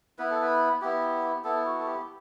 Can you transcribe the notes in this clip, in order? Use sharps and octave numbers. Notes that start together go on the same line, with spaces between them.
B3 E4 B4
A4
B4
B3 E4 G4
B3 E4 A4
F#4
A4
G4